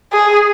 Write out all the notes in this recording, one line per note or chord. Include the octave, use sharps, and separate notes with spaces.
G#4